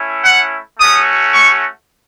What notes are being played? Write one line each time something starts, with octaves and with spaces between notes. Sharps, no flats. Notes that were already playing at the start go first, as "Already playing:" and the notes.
Already playing: A3 C#4 E4
F#5
A3 C#4 F#4 D#6
C#6